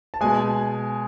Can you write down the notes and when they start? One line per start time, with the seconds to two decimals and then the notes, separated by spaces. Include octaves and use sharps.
0.14 A5
0.21 B2 G#3 G#5